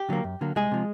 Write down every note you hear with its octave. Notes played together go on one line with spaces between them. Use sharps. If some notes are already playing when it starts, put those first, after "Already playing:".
Already playing: G4
D3 F#3 A#3
F#2
D3 F#3 A#3
C2 G#3 G#4
C3 F3